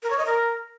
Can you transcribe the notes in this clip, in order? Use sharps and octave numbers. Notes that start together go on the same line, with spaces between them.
A#4
C#5
D#5
A#4